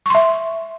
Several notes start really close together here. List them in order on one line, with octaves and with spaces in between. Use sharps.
C#6 C6 E5